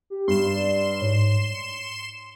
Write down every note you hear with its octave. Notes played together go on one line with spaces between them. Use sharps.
G4
G2 C6 E7
D5
G#2 C#5
C#7